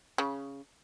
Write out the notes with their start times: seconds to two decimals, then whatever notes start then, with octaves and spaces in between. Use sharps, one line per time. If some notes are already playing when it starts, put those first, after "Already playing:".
0.18 C#3